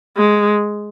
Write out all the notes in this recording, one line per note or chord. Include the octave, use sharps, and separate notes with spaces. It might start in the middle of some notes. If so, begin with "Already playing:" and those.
G#3